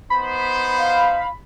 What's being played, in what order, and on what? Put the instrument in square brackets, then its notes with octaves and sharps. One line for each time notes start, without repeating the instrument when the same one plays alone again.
[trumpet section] B3 D#4 C5 [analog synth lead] B5
[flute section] F5